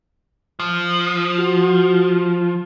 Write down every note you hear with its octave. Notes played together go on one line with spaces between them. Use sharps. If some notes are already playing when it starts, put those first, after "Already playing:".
F3
F#4